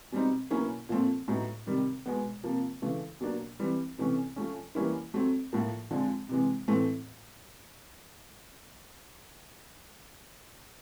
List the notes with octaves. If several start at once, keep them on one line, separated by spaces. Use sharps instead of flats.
B2 G3 C4 D#4
B2 F#3 A#3 C#4 E4
A#2 F3 A3 C4
A2 F#3 B3 D#4
C3 D#3 G3
B2 G#3 B3
C3 F3 A#3
C#3 E3 A3
B2 F#3 A#3 D4
E3 G3 C4
C3 E3 A3 C#4
F3 A3 C#4
E3 G3 A#3 C#4 E4
F#3 A3 C4
A2 F3 A#3
D3 F3 G#3 C4
C3 E3 G#3
A2 E3 A3 C4